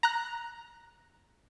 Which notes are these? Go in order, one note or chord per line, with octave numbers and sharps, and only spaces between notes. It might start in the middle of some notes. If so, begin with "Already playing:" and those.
A#5 F#6